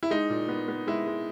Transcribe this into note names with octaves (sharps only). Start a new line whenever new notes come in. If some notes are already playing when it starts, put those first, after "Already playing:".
E4
G#3 D#4
A#2
B3
B3
G#3 E4
G#3